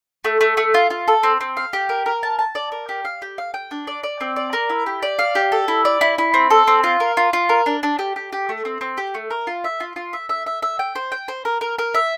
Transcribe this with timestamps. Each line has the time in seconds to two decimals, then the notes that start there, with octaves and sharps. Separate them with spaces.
0.25 A3
0.41 A3
0.57 A3
0.74 F4
0.90 F4
1.08 A4
1.23 C4
1.41 C4
1.57 F5
1.73 G4
1.89 A#4
2.06 A#4
2.23 A5
2.39 A5
2.55 D5
2.72 A#4
2.89 G4
3.05 F5
3.22 G4
3.38 F5
3.54 G5
3.71 D4
3.87 D5
4.03 D5
4.21 C4
4.36 D5
4.53 A#4
4.70 E4
4.86 G4
5.02 D5
5.19 F5
5.35 G4
5.52 A4
5.68 E4
5.85 D5
6.01 E4
6.18 E4
6.34 C4
6.50 A4
6.67 C4
6.84 F4
7.00 A#4
7.17 F4
7.33 F4
7.49 A#4
7.66 D4
7.83 D4
7.99 G4
8.16 G4
8.33 G4
8.49 A3
8.65 C4
8.81 C4
8.98 G4
9.14 A3
9.30 A#4
9.47 F4
9.64 E5
9.80 F4
9.96 F4
10.13 E5
10.29 E5
10.46 E5
10.63 E5
10.79 G5
10.95 C5
11.12 G5
11.28 C5
11.45 A#4
11.61 A#4
11.78 A#4
11.94 E5